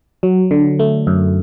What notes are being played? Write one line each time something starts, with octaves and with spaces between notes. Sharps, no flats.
F#3
D3
A3
F#2